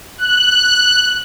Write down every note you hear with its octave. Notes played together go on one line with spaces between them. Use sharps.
F#6